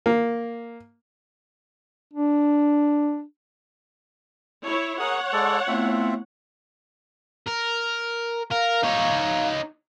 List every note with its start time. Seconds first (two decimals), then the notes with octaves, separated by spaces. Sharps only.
0.06 A#3
2.13 D4
4.66 E4 C#5
4.99 G#4 A#4 C#5 F#5 D#6
5.33 G#3 A4 D5
5.68 A3 B3 C4 E4 F4 E5
7.47 A#4
8.51 A#4 F5
8.83 D#4 C#5